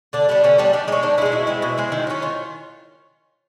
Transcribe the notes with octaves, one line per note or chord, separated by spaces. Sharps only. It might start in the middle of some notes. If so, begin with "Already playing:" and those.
D3 D4
G3 B3 D4
D3 C#4
G3 B3 D4
D#3 D4
G#3 C#4 D#4
D#3 D4
G#3 C#4 D#4 E4
B2 E4
G#3 C4
B2
G#3 C4
D#3
F#3 A#3 C#4
D#3 F4